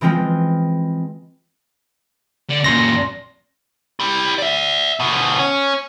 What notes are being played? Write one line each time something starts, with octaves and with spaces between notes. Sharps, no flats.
E3 F3 G#3 C4 F4
D3
F#2 A#2 C6 A#6
E4 G4
D5 E5
D2 B2
C#4